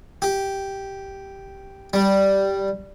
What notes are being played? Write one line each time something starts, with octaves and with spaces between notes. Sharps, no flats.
G4
G3